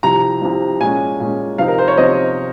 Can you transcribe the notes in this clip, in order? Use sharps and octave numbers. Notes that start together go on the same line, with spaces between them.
C2 C3 F3 A#5
C2 C3 F3
A#2 G#3 C#4 G#5
A#2 G#3 C#4
C3 F3 C4 D#4 F5
A#4
C5
C#5
C3 F3 C4 D#4 D#5